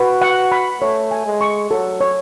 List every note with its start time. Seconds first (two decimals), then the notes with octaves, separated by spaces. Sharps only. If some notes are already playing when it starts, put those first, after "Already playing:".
Already playing: F#4 B4
0.22 F#5
0.52 B5
0.81 A3 C#5
1.11 G#5
1.26 G#3
1.41 C#6
1.70 F#3 A4
2.01 C#5